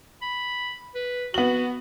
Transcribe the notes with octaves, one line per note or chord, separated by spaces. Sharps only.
B5
B4
B3 F#4 F#7